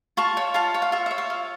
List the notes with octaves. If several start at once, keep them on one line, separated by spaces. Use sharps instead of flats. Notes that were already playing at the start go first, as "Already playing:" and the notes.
F4 A5 C#6
C#5
F4 F5 A5
C#5
F5
F4 E5
C#5 E5
F5
F4